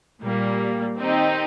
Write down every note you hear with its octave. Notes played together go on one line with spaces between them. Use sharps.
A#2 G3 A#3
D#3 C4 D#4 G4